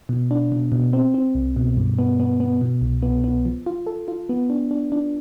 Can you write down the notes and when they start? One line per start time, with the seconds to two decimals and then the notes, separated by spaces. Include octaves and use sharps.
0.09 B2
0.31 D4
0.52 B2
0.72 B2
0.93 C4
1.14 C4
1.35 C2
1.56 B2
1.77 G2
1.99 B3
2.20 B3
2.40 B3
2.61 B2
2.81 C2
3.02 B3
3.24 B3
3.45 F3
3.66 F4
3.87 A4
4.08 F4
4.29 B3
4.50 D4
4.71 D4
4.92 D4